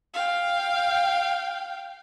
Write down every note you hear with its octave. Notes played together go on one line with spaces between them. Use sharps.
F5 G5